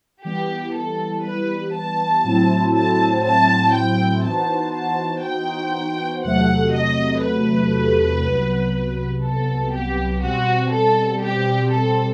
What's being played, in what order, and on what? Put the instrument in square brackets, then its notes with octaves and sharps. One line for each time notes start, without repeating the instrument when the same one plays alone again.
[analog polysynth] E3 G3 B3 [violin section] G4
[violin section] A4
B4
A5
[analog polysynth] A2 F#3 C4 E4
[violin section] A5
A5
G5
[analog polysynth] E3 B3 D#4 F#4 C5 [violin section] A5
[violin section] A5
G5
[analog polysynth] E2 C3 F#3 A3 [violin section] F#5
[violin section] D#5
B4
[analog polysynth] C2 C3 F#3 B3
[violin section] A4
G4
[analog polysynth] B2 G3 C4 [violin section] F#4
[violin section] A4
G4
A4